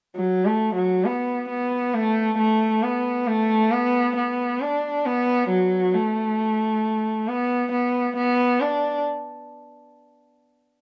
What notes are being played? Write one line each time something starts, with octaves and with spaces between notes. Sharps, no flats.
F#3
A3
F#3
B3
B3
A3
A3
B3
A3
B3
B3
D4
B3
F#3
A3
B3
B3
B3
D4